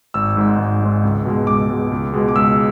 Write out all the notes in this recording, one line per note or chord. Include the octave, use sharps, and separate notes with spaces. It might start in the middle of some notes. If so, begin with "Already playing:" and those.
G#1 E6
G#2 G#3
G#1
G#2 G#3
C#2
B2 G#3
C#2 D6
B2 G#3
C#2
B2 G#3
D6
C#2 E6